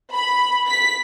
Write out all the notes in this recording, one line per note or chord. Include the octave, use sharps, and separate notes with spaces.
B5
B6